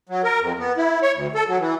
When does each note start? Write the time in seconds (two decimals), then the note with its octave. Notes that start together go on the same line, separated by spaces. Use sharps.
0.09 F#3
0.24 A#4
0.40 F2
0.59 B3
0.77 E4
1.02 C#5
1.15 D2
1.35 A4
1.48 F#3
1.60 E3